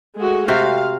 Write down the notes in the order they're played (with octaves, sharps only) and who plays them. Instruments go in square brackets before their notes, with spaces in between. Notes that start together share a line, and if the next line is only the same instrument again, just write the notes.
[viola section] G#3 A3 F#4
[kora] C3 C4 F#4 [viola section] F5